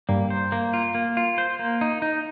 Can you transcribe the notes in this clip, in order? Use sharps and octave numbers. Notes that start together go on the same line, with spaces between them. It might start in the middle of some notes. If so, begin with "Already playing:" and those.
G2 G3 A#3
C5
A#3
F4
A#3
F4
C5
A#3
D#4
D#4